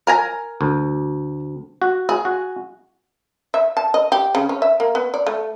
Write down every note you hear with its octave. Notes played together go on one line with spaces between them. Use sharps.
A#4 G#5 A#5
D2
F#4
G#4
F#4
E5
A5
D#5
G4
C#3
C#4
E5
A#3
B3
D5
A3